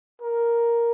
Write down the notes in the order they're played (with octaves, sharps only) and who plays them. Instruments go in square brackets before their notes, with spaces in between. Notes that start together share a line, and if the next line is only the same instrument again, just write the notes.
[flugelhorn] A#4